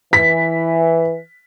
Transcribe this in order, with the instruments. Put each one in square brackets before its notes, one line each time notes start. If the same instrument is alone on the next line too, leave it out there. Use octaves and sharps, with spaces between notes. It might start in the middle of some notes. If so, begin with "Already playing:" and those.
[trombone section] E3 [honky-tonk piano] B6